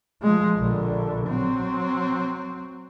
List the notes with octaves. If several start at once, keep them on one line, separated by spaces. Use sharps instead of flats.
F3 G#3
A#1 D3
F#3 C4